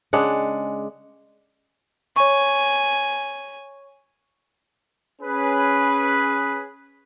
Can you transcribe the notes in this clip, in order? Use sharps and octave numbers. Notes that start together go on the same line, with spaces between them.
C#3 G#3 D4 F#5
C#5 G#5 C#6
C#4 G#4 B4